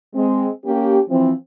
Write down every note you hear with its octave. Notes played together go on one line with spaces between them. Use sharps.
G#3 C4
A#3 C#4 G4
E3 F3 C4